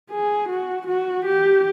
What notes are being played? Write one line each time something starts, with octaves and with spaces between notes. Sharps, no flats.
G#4
F#4
F#4
G4